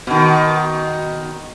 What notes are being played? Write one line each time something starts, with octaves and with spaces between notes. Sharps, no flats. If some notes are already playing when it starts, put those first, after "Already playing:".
B2 D#3